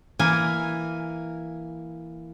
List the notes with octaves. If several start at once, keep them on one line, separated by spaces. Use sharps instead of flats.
E3 A#3 G#5